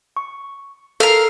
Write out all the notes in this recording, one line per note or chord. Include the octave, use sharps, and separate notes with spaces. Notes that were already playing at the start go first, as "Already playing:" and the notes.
C#6
A4 A#4 F5